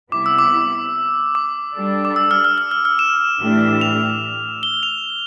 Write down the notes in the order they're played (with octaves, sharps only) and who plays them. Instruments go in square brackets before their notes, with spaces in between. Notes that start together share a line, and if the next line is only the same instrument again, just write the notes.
[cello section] C3 G3 B3 E4 [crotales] D6
[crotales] E6
D6
D6
[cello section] G3 D4 A4 D5
[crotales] D6
E6
F6
F6
F6
F6
F6
E7
[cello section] A2 E3 A3 D4 G4
[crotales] F7
G7
F7